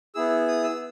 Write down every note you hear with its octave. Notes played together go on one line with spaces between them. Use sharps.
B3 E4 G#4 E6
D#6
E6